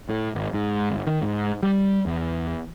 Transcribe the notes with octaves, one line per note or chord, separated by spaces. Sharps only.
A2
G#1
G#2
G1
D#3
G#2
G3
E2